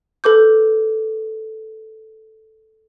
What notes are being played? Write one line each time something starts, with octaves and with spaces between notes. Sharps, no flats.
A4 B4 D6 G6